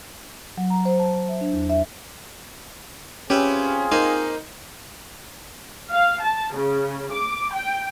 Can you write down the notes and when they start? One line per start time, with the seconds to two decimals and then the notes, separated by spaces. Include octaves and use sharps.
0.58 F#3
0.70 A#5
0.85 C5
0.99 A5
1.29 E5
1.41 D4
1.53 E2
1.70 E5
3.30 C4 C#4 F4 G4 G#4 B4 E5
3.92 A#3 D#4 C5 G#5
5.90 F5
6.22 A5
6.55 C#3
7.13 D6
7.54 G5